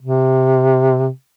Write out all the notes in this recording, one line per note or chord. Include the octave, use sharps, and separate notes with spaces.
C3